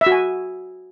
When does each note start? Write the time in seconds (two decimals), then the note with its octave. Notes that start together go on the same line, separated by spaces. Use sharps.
0.01 E5
0.06 F#4
0.12 G#5